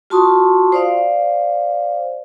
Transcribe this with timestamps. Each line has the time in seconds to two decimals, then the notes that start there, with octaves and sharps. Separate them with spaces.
0.10 F4 F#4 A5 C6 C#6 D#6
0.72 C5 D5 F5